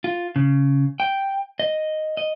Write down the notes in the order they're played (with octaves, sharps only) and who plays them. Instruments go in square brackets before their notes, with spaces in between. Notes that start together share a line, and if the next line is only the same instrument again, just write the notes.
[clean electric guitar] F4
C#3
G5
D#5
D#5